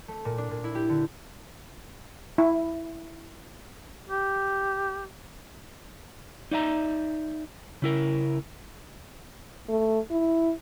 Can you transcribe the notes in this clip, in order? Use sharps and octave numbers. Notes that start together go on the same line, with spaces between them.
A3
A#2
D4
A#2
E4
G4
D3
E4
G4
D#4 D5 E5 A#5
C#3 E4 A#4
A3
E4